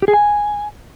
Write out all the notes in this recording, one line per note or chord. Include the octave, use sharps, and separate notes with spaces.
G4
G#4
G#5